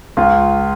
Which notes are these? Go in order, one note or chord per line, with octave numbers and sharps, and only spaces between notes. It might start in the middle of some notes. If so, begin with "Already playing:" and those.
C#2 F4